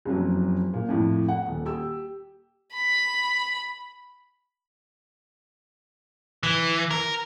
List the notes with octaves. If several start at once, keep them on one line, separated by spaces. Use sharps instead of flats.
F#1 F2 F#3
A#2
F2 A2
F#5
D#1
G4 E6
B5
E3
A#4